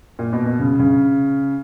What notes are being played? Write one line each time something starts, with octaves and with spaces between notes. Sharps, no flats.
A#2
B2
B2
C#3
C#3